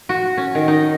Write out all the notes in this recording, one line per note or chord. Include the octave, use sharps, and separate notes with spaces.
F#4
C#4
D#3
D#4